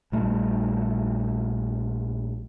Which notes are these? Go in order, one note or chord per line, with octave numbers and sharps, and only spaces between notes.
A#1 G3 A3